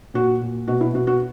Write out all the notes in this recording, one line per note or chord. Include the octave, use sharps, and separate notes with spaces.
A#2 F#4
A#2
B2 F#4
E4
B2 F#4
F#4